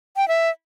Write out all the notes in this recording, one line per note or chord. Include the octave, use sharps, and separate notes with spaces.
G5
E5